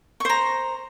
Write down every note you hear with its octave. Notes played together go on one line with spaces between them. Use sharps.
C5 A#5 C#6